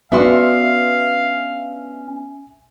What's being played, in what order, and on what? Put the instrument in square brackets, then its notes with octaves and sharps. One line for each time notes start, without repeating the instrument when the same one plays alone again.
[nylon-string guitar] B3 D4 F#4 [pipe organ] C#4 [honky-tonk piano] E5 C6 [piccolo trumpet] F5